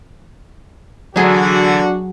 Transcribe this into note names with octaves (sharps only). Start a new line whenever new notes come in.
D3 E3 F#3 D4 F#4 G#4